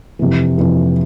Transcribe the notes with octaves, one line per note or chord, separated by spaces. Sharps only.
F2 C3 E3
F2 C3 E3